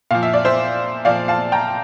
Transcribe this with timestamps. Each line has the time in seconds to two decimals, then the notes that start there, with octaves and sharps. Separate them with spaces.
0.11 A#2 F3 F5
0.23 E5
0.33 D5
0.45 C5 E5
1.05 A#2 F3 D5 F5
1.28 F5 A5
1.52 G5 A#5